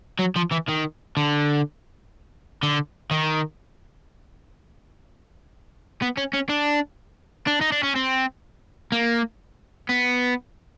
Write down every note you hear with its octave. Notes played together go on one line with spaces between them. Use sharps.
F#3
F3
E3
D#3
D3
D3
D#3
B3
C#4
C#4
D4
D4
D#4
D4
C#4
C4
A#3
B3